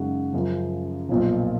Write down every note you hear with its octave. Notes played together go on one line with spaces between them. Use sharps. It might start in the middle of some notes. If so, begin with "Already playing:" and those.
Already playing: F#2 C#3 G#3 D#4 F#4
F#2 C#3 F3
B1 A#2 F3